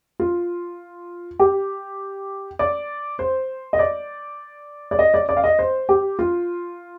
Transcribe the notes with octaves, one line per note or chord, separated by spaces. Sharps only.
F4
G4
D5
C5
D#5
D5
D5
D#5
D5
D5
F5
D#5
C5
G4
F4